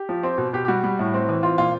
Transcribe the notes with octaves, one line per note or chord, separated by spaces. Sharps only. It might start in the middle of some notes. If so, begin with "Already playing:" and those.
Already playing: G4
F3
C4
B2
B2 G4
G4
G3 F#4
G3
A2
C4
E3
C4 F4
A#2 F4